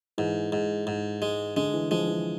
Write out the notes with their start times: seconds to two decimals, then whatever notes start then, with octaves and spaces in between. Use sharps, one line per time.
0.18 G#2 E3
0.52 G#2
0.87 G#2
1.22 G#3
1.56 D3 G#3
1.74 E3
1.91 F3 G#3
2.08 E3